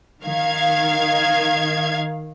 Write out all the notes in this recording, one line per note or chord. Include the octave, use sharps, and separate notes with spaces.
D#3 F5 G#6